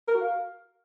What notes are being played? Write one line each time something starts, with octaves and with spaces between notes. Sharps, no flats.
A#4
F#4
F5